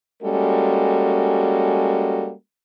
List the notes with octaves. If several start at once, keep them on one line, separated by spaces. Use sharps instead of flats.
G3 G#3 A#3 C#4 F#4 A4